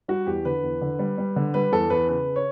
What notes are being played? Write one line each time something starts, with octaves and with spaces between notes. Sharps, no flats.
G3 F#4
E2 G4
D3 B4
E2
D3
G3
G3
D3
G3 B4
E2 A4
E2 B4
C#3 B4
C#5